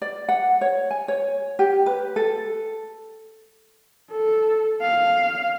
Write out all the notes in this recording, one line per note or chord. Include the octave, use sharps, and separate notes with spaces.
D5
F#5
C#5
G#5
C#5
G4
B4
A4
A4
F5